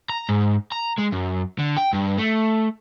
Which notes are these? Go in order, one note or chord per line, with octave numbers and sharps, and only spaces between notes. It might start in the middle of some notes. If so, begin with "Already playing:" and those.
A#5
G#2
A#5
G#3
F#2
D3
G5
G2
A3